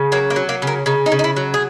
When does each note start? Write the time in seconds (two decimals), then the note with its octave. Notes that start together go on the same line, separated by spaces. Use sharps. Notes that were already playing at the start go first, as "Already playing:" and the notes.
Already playing: C#3
0.12 F#3 A#3
0.30 A#3
0.36 F#3
0.49 A#3
0.62 C#3
0.67 A#3
0.86 C#3 D#4
1.06 D#4
1.12 C#3
1.19 D#4
1.24 E4
1.36 F#3
1.54 G#4